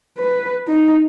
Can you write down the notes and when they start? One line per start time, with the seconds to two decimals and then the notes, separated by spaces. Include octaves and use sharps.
0.18 B4
0.68 D#4